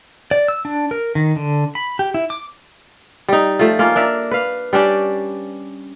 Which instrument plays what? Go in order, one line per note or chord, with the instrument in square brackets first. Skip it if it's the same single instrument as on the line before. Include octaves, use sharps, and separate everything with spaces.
[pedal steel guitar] D5
E6
D4
A#4
D#3
D3
B5
G4
E4
D6
[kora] G3 D#4
F3 A3
A#3 C#4 F4
D4 A#4 E5
B4 F5
G3 C#4 D4 G4